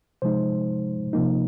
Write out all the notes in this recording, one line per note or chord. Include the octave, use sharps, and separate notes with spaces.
C3 F3 G#3 D#4 C5
C3 F3 A#3 D#4